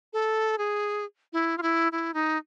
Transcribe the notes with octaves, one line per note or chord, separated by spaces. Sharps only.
A4
G#4
E4
F4
E4
E4
D#4